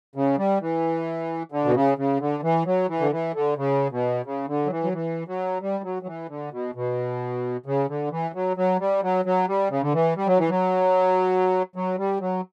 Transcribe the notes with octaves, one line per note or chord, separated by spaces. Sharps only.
C#3
G3
E3
D3
B2
C#3
C#3
D3
E3
F#3
E3
D3
E3
D3
C#3
B2
C#3
D3
F#3
E3
F#3
E3
F#3
G3
F#3
F#3
E3
D3
B2
B2
C#3
D3
E3
F#3
F#3
G3
F#3
F#3
G3
C#3
D3
E3
G3
F#3
E3
F#3
F#3
G3
F#3